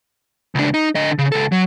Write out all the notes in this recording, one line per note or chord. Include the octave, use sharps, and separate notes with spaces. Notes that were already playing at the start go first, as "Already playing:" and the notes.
C#2 D4
D#4
D3 D#5
C#3
C#2 A4
F#3